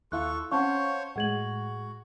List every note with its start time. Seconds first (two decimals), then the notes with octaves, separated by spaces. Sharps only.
0.12 D#2 E4 F4 A4 F5 C#6 F#6
0.51 C4 C#4 C5 C#5 F5 F#5 A5 C#6
1.16 A2 G#3 F#4 F#5 G#6 F#7